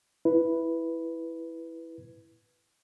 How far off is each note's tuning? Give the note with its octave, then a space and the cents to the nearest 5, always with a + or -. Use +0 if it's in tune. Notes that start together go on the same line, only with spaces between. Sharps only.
E4 +0 B4 +0